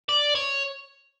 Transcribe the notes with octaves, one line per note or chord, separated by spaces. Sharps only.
D5
C#5